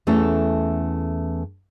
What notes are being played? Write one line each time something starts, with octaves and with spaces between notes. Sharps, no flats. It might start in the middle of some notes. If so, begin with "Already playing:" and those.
E2 A3 C#4 E4 A4